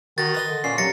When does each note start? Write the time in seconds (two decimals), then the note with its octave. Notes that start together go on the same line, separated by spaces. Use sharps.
0.18 D#3 F#4 A6 A#6
0.34 B4 D#5 C6
0.48 D3
0.64 A#2 C#4 C7
0.78 D#2 F#3 A6 A#6 C#7